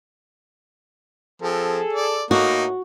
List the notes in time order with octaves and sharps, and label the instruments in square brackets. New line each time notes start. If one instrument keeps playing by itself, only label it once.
[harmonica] F3 C4 [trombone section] G#4 A4
[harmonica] D5
[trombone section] A2 [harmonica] A#3 D#4 [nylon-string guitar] F#4